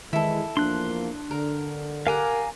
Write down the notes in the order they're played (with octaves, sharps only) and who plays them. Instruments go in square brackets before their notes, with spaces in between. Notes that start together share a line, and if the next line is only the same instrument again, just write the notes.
[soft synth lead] D#3 [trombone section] E3 G#3 [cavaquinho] E4 A4
[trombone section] E2 F3 A#3 [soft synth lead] D4 [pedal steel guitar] C6 F#6
[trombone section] D3 [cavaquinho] A#4
[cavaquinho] G4 D5 F#5 [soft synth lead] A#4 [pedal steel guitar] F5 G#5 A#5